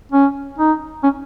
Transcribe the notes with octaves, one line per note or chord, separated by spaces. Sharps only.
C#4
D#4
C#4